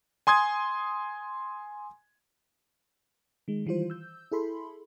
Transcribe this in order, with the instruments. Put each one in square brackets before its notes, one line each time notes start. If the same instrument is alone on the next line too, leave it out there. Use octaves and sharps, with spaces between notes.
[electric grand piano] G#5 C6 D#6 G#6
[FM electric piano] D#3 G#3
D#3 E3 G3 F4 C5
E6 G6
E4 G#4 A4 B5 C6